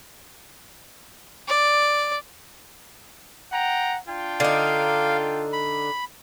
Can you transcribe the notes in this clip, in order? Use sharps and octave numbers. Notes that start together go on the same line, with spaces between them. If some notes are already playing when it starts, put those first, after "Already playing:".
D5
F#5 G5 A#5
D4 F4 G5
D3 D#4 F5
B5